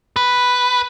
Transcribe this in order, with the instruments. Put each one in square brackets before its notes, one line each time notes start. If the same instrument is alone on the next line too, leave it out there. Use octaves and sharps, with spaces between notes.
[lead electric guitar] B4